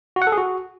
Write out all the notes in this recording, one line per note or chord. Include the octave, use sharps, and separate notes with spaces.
F#4
F#5
A4
G#4
F#4